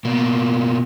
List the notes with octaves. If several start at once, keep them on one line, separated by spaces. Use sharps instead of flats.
B2 A#3